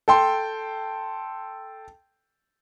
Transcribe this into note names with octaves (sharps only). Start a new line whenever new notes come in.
A4 G5 C6